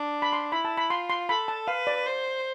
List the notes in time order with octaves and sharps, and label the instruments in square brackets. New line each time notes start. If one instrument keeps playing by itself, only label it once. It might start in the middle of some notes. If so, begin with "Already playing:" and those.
Already playing: [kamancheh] D4
[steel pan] B5
C6
[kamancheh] E4 [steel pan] B5
[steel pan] A5
B5
[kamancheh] F4 [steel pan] C6
[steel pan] C6
[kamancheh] A4 [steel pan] B5
[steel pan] A5
[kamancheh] B4 [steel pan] F5
[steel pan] D5
[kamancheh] C5